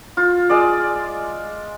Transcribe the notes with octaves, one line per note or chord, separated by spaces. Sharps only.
F4
G#3 D5